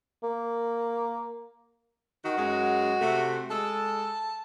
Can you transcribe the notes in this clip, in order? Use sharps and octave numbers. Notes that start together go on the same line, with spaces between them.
A#3
D#3 F#4
F#2 G#3
C3 A3
G#3 A4 A5